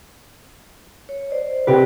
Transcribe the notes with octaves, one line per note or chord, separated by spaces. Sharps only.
C#5
C5 D5 D#5
C3 G4 B4